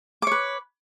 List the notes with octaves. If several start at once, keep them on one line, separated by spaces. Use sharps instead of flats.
B4 C#5 D6